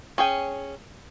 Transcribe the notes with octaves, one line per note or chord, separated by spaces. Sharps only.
C#4 G#4 G5